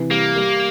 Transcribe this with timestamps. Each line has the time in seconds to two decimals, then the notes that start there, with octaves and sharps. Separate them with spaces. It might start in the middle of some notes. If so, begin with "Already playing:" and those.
Already playing: C3 E3
0.10 G3 A#3
0.36 G3